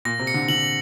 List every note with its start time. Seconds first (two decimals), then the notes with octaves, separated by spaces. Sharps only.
0.05 A#2 A#6
0.19 C3
0.27 C#7
0.34 D3
0.48 D3 F#7